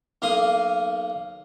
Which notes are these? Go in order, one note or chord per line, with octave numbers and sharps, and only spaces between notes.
B1 A#3 F5 C6 D#6